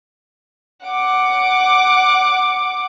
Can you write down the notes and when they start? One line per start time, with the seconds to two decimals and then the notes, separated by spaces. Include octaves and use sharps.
0.86 F#5 D6